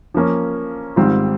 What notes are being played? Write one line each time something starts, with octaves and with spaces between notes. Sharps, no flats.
F3 A#3 C#4
G#2 D#3 G3 C4 F4